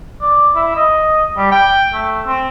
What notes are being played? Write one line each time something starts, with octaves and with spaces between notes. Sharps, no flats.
D5
E4
D#5
G3
G5
A3
C4